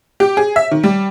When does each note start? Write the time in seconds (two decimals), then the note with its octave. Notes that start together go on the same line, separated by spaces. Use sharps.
0.20 G4
0.37 G#4
0.56 E5
0.71 D#3
0.84 G3